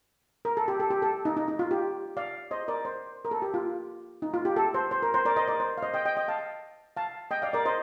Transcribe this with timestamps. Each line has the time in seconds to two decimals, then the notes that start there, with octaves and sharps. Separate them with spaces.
0.45 A#4
0.57 A4
0.68 G4
0.80 A4
0.90 G4
1.02 A4
1.25 D#4
1.37 D#4
1.48 D#4
1.59 F4
1.71 G4
2.17 D5 F5
2.51 C5 D#5
2.68 A#4 D5
2.85 C5
3.25 A#4
3.31 A4
3.42 G4
3.54 F4
4.22 D#4
4.34 F4
4.45 G4
4.56 A4
4.74 C5
4.91 C5
5.02 A#4
5.14 C5
5.26 A#4 D5
5.36 C5 D#5
5.48 A#4 D5
5.60 C5
5.78 F5
5.82 C5 D#5
5.94 D#5 G5
6.05 D#5 G5
6.16 D#5 G5
6.28 F5 A5
6.97 F5 A5
7.31 D#5 G5
7.42 D5 F5
7.53 A#4 D5
7.66 C5 D#5